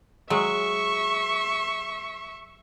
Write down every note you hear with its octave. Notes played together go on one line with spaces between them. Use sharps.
F#3 G#3 E5 C#6